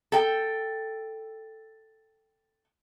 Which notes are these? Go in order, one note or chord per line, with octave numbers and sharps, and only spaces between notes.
A4 G5